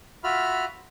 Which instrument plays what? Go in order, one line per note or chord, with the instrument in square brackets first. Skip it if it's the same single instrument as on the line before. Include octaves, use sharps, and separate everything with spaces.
[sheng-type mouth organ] F4 F#4 E5 B5 F6